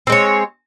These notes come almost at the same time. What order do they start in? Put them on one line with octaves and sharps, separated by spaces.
C4 G#3 C#5